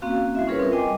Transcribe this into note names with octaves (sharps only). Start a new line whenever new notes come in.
A#3 C4 C#4 F#4 F5
G3 E4 E5
C#4 F4 G#4 A#4 B4 C#5
C4 A#4
G3 D#5 G5 G#5 D6